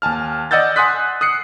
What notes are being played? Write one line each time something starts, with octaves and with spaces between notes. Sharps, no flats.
D#2 G#5 A5 F6
D5 D#5 F#5 E6 G6 A6
F#5 G#5 C6 D#6 F#6 B6
D#6 F#6 C7 C#7